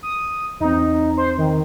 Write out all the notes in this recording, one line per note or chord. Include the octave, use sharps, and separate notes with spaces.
D#6
E2 C4 D#4
C5
D#3